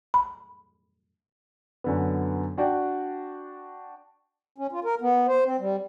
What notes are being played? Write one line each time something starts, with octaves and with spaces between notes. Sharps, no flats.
B5
F#2 D3 B3
D4 F#4 D5 G5
C#4
F4
A#4
B3
C5
C4
G3